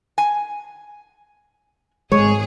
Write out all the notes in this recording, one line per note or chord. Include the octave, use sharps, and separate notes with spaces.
G#5
G#1 G#3 G#4 C#5